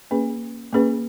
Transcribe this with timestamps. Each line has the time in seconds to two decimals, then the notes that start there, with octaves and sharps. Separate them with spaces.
0.11 A#3 C#4 G#4 B4
0.73 A#3 C#4 G#4 B4